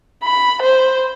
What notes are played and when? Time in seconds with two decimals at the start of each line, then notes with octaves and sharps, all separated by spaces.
0.23 B5
0.62 C5